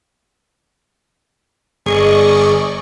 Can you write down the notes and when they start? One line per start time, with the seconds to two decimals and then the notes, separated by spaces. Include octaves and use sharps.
1.86 G1 G#4 D5 D#5 C#6